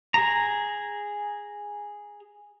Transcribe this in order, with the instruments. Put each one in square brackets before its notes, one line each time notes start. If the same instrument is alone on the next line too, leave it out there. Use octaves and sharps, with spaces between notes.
[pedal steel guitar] G#4 A#5